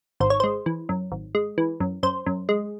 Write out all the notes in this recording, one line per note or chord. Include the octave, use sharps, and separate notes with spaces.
G#1 C5
C#5
G#3 C5
E3
F#2
G#1
G#3
E3
F#2
F#2 C5
F#2
G#3